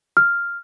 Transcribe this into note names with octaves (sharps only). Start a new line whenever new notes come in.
F6